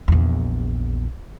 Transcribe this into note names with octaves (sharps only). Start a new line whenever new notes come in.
A#1 E2